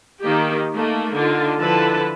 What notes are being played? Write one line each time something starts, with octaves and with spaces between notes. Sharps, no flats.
D#3 A#3 D#4 G4
A3 A#3 D#4
D3 D#4 F4
D3 F3 E4 A4 B4 A5